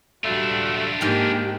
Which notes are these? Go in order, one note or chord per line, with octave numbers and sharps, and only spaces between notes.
G3 A3 D4 F4 F#4
G#2 D#3 A#3 G4 G5